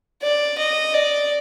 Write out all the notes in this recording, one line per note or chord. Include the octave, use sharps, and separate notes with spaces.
D5
D#5
D5